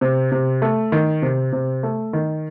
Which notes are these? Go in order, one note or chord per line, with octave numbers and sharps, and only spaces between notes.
C3
C3
A3
D#3
C3
C3
A3
D#3